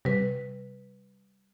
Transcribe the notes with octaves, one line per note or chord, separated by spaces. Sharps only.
C3 G3 B4